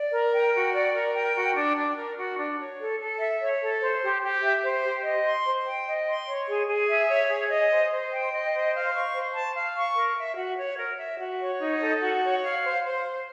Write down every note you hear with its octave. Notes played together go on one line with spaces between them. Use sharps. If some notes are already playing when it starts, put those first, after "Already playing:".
Already playing: D5
A#4
G5
F#4
D5
A#4
G5
F#4
D4
D4
A#4
F#4
D4
C#5
A4
A4
E5
C#5
A4
C5
G4
G4
E5
C5
G4
D#5
C6
C5
G5
D#5
C6
C#5
G#4
G#4
E5
C#5
G#4
D#5
C5
C5
G5
D#5
C5
F5
C#6
C5
A5
F5
C#6
A#4
E5
F#4
C#5
A#4
E5
F#4
C#5
D#4
A4
F#4
C#5
F5
C5
C5